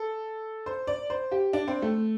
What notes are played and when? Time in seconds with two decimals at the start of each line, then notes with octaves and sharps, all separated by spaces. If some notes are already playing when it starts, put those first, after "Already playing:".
Already playing: A4
0.66 C5
0.87 D5
1.10 C5
1.32 G4
1.53 D4
1.68 C4
1.82 A3